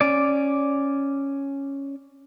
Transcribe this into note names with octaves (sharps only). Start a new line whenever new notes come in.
C#4 D5